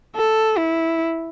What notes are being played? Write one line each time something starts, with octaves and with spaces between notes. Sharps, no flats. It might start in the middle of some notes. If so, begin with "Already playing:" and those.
A4
E4